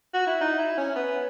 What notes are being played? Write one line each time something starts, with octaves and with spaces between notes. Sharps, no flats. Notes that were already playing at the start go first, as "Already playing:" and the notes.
F#4
E4
D#4
E4
C#4
B3